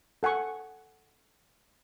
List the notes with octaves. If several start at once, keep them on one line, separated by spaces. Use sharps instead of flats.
A4 F#5 G#5 C#6